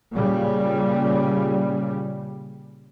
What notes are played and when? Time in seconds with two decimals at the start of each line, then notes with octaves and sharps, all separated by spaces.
0.13 A#2 C#3 G3